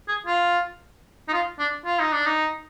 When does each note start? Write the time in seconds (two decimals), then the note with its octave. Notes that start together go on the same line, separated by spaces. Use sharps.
0.08 G#4
0.27 F4
1.28 D#4
1.33 F4
1.59 D4
1.85 F4
2.00 D#4
2.13 D4
2.26 D#4